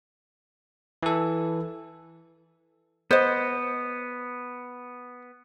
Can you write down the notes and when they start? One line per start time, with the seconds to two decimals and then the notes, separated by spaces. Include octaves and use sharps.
1.03 E3 A4
3.11 B3 C5 D#5